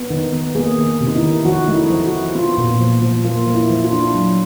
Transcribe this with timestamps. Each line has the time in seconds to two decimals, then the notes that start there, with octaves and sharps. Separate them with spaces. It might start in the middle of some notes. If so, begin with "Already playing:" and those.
Already playing: B3
0.10 D#3 D#4
0.33 B3
0.55 A#3 G#4
0.78 D#3
1.01 C3
1.08 D#4
1.16 E4
1.23 D#3
1.45 F3 F#4
1.64 A3 D#4
1.75 E4
1.90 F3
2.05 F#4
2.13 F3
2.35 B3 F4
2.58 A#2
2.80 F3
3.02 F3
3.25 A#3 F4
3.47 F3
3.55 E4
3.70 F3
3.85 F4
3.92 D4
4.15 F#3